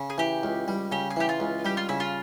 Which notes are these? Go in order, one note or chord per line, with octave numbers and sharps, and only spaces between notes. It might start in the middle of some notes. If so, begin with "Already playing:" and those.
Already playing: C#3
G#4
E3 G4
C#2
G3
C#3 G4
G#4
E3 G4
F4
C#2
G3 G4
F4
C#3 E4
F4